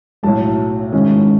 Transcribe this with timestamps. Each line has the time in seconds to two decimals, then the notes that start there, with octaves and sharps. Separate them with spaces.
0.23 B1 A2 F#3 A3 A5
0.92 G#2 D#3 G#3 C#4 E4